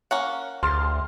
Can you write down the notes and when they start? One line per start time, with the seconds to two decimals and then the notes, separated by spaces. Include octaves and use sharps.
0.11 A#3 C#4 F#5
0.63 D2 C6 F6 A6